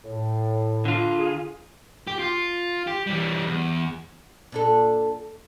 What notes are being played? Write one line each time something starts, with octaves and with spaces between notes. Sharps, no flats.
A2
D3 F4
G#4
G4
F4
G4
E3 G3
E2
A#2 D4 A4